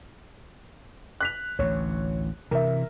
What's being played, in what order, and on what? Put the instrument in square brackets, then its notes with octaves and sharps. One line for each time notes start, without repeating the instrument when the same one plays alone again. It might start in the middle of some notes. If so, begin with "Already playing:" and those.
[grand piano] F#6 B6 F7
[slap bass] A1 D2 E3 [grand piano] C#5
[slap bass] C3 E3 [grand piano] A#4 E5